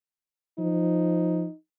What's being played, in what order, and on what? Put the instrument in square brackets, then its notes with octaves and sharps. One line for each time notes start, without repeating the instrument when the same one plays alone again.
[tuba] F3 [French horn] D#4